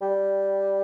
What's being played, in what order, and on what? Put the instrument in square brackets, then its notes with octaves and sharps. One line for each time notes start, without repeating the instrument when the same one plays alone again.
[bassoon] G3